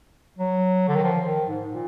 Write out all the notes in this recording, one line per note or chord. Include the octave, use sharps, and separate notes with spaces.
F#3
D3
D#3
F3
D#3
G#2
A#2